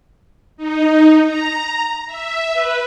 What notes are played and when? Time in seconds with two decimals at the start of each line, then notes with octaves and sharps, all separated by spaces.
0.57 D#4
1.24 A#5
2.07 E5
2.53 B4